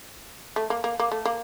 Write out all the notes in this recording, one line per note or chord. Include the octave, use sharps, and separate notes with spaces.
A3
A#3
A#3
A#3
A3
A#3